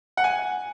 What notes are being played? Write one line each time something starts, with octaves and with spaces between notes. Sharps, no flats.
F#5
G#5